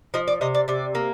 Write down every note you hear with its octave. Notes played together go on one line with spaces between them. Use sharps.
F3 D#5
D5
C3 D#5
D5
C3 D5
A#3